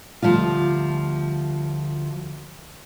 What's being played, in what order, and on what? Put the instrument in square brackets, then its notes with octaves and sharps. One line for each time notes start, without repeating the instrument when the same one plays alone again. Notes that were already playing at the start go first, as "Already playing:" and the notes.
[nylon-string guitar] D2 F3 G3 F4